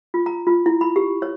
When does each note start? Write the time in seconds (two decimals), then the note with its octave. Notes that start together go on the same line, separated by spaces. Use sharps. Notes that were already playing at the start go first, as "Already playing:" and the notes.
0.14 F4
0.26 A#5
0.47 F4
0.66 E4
0.81 B5
0.96 G4
1.22 C#5